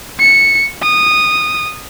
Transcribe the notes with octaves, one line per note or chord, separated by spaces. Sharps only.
C#7
D#6